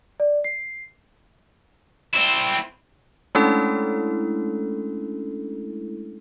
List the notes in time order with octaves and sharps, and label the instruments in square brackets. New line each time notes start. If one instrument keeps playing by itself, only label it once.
[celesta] D5
C7
[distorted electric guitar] C4 E4
[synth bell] G#3 A3 C#4 D4 E4 A4